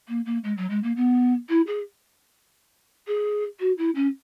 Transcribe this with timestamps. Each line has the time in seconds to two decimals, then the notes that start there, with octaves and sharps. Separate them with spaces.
0.08 A#3
0.26 A#3
0.44 G#3
0.57 F#3
0.70 G#3
0.83 A#3
0.96 B3
1.49 E4
1.67 G#4
3.07 G#4
3.60 F#4
3.78 E4
3.95 C#4